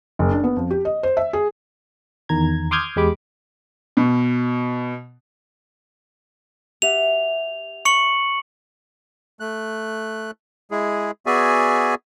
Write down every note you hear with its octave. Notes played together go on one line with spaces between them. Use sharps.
F#1
D4
B3
F2
G4
D#5
C5
E5
G#4
E2 D#3 A#5 G#6
C6 D6 D#6 F6 G6 G#6
E2 G#3 G4 B5 D6
B2
G4 E5 F#5 F7
C#6 C#7 F#7
A3 F#6
G#3 E4 G#4
B3 F#4 G#4 D5 E5 G#5